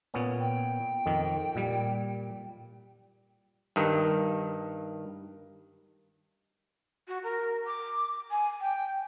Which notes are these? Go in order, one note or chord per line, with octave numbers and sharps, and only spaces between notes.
A#2 B3 C#4
G5
F2 D#3
A#2 G3
G2 D#3
F#4
A#4
D6
G#5
G5